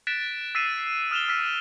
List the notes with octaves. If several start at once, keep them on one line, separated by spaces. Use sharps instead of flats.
F#6 A6 B6 D7 E7
E6 A6 B6 C7 D#7 E7
D#6 F6 E7 F7 G7
E6 F6 B6